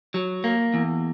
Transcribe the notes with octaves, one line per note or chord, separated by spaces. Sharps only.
F#3
A#3
E2